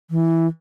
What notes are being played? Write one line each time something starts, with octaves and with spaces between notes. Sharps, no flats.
E3